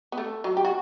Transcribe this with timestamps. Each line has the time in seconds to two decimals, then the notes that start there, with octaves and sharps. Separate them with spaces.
0.12 B3
0.18 A3
0.44 F#3
0.57 G4
0.65 F#4